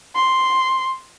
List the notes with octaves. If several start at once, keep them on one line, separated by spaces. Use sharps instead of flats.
C6